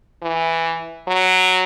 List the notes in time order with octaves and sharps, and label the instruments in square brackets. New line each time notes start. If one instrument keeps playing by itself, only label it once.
[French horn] E3
F#3